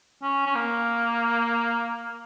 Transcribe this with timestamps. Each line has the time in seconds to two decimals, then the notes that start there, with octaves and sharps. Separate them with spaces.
0.22 C#4
0.47 C#4
0.55 A#3